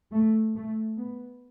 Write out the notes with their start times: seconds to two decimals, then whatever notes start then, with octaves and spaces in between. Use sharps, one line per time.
0.13 A3
0.55 A3
0.98 B3